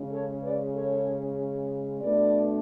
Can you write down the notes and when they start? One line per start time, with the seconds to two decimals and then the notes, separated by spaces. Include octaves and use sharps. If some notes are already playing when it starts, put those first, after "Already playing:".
Already playing: C#3 G#3 C#4
0.11 A4 C#5
0.42 B4 D5
0.74 A4 C#5
2.01 B2 A3 D4 B4 D5